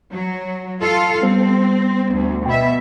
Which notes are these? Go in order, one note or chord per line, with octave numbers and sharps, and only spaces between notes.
F#3
F4 A4 F5
G3 B3 C4 C5
D2
B2 E5 G5 B5